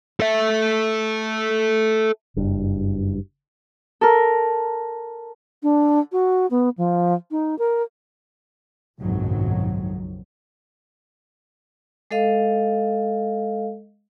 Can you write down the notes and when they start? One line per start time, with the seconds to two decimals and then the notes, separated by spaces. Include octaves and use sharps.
0.20 A4 E5
2.36 F#1 G2
4.01 A4 A#4
5.63 D4
6.12 F#4
6.51 B3
6.78 F3
7.31 D#4
7.59 A#4
8.99 F#1 B1 F2 G#2 D#3 F#3
12.11 G#3 A4 D#5 F5